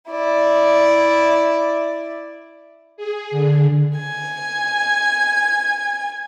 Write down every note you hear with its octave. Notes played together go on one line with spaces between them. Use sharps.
E4 D5
G#4
D3
G#5 G#6